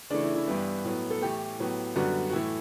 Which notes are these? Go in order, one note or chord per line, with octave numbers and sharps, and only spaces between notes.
C#3 E3 A3 D4
E4
E4
G2 E3 G3 B3 E4
A2 F#3 B3
A4
A2 E3 A3 G4
A2 F#3 B3
F#2 D3 G3 B3 F#4
F#4
A2 E3 A3 E4